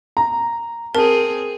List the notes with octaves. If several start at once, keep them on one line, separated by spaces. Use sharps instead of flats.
A#5
C4 G#4 A#4 A5